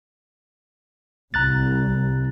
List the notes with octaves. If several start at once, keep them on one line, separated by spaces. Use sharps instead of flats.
C2 A#5 F#6 A6